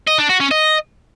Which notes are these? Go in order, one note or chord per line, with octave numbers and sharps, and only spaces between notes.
D#5
D4
F#4
C#4
D#5